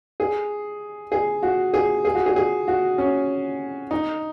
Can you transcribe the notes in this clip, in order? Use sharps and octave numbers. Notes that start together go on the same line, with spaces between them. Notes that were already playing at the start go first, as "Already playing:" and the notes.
G#4
G#4
F#4
G#4
G#4
F#4
G#4
G#4
F#4
C#4
D#4